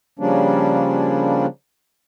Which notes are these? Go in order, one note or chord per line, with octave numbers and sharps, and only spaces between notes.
C#3 F3 G3 A#3 C#4 D4